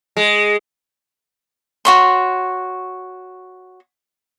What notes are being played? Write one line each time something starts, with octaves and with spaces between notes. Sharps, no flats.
G#3
F#4 C#5 C6